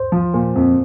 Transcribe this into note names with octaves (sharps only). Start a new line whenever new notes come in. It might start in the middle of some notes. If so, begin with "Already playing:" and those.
Already playing: C5
F3
A#2
F2